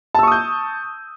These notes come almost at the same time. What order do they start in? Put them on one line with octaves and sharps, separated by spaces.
A5 E6 C#6 D#6 G6